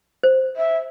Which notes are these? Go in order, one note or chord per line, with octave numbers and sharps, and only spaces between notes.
C5
E5